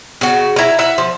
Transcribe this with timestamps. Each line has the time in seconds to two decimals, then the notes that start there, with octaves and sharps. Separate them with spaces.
0.21 C#3 F#4
0.56 E4 A#5
0.79 E5 F#5
0.98 F3